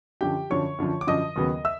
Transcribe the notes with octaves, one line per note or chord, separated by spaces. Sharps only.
F#2 D3 F3 G4 G5
F#2 D3 F3 C#5 C#6
F#2 D3 F3
D6
F#2 D3 F3 D#5 D#6
D#2 C#3 F#3 B3
E5 E6